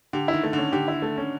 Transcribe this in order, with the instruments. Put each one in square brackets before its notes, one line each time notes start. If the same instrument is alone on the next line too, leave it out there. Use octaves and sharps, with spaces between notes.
[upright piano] D3 [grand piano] G4
[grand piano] E4
[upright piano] D#3
[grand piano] A3
[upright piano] D3 [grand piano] C#4
[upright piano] D3 [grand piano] G4
[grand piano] E4
A3
C#4